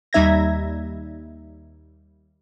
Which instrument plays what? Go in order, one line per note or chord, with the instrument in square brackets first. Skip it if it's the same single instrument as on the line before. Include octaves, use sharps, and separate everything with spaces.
[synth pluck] D#2 G3 D#4 E5 G#6 A#6